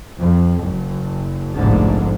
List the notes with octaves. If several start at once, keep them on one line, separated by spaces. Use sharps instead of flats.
F2
F#1
F1 A#1 G#2 D3